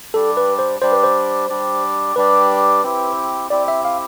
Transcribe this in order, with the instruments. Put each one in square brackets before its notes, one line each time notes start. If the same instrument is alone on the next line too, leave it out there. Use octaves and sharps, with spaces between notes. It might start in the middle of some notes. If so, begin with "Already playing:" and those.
[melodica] G3 D4 G4 D5 [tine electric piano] A4
[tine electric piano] B4
C5
[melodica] G3 D4 G4 D5 [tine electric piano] C5
[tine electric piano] B4
C5
[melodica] G3 D4 G4 D5
[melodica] G3 D4 G4 D5 [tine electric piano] B4
[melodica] C4 E4 G4
[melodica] C4 E4 G4 [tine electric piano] D5
[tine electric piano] E5
F5